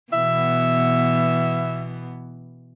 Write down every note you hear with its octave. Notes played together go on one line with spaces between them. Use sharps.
B2 E3 B3 E5